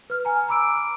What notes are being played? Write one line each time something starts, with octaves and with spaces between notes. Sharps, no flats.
B4 F6
G#5 A#5
A#5 B5 D6 E6 D7